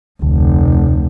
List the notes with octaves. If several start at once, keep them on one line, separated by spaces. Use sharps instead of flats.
F1 D2